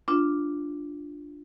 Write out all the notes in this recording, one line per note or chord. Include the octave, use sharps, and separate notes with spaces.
D4 F4